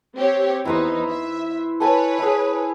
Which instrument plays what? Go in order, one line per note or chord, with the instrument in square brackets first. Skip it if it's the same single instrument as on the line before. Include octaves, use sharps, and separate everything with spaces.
[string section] C4 G4 C#5
[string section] E2 D#4 [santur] E4 B4 C5
[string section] E5
[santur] A4 G#5 [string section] B4 C#5
[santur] E4 G#4